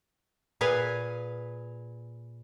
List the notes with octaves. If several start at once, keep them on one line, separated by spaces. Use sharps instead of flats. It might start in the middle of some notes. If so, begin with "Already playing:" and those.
A#2 G#4 B4 F5 G#5